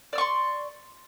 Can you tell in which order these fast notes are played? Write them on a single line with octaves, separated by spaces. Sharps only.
D5 E6 C#6 C6